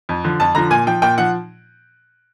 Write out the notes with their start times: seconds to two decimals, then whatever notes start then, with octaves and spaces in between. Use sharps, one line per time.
0.09 F2
0.24 D3 F3
0.40 F2 A5
0.55 D3 F3 A#5
0.70 A#2 G#5
0.87 F3 G5
1.02 A#2 G5
1.18 F3 F#5